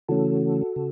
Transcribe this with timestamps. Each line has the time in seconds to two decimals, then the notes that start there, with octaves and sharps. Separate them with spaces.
0.09 C#3 E3 A3 C#4 F#4 A4
0.76 C#3